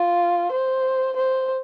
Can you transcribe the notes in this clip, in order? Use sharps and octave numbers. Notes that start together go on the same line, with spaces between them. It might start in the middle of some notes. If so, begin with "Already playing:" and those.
Already playing: F4
C5
C5